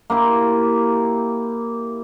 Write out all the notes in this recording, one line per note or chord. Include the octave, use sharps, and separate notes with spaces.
A#3 E4 G4 C6